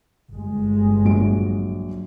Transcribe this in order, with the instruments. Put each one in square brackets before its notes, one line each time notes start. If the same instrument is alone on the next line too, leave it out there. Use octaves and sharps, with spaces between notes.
[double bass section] G1 G#3
[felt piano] A#1 F#3 D7